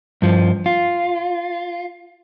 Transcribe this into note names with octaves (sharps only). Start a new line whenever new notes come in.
G2 F3
F4